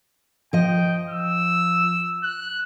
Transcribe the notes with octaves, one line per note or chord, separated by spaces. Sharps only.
F3 D#5 G5
E6
F#6